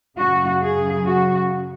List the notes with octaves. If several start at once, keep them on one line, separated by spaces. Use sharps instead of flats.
F#2 C#3 F#4
G#4
F#4